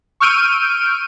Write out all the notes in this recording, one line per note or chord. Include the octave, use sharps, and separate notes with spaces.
C#6 E6 F6 G6 D7 D#7